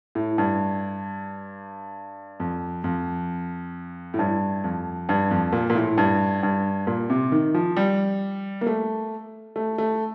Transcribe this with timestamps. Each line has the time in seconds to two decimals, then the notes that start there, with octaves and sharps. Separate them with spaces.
0.15 A2
0.38 G2
2.40 F2
2.84 F2
4.14 A2
4.19 G2
4.64 F2
5.09 G2
5.31 F2
5.53 A#2
5.70 A#2
5.75 A2
5.98 G2
6.43 G2
6.87 A#2
7.10 C3
7.32 D#3
7.54 F3
7.77 G3
8.61 A#3
8.66 A3
9.56 A3
9.78 A3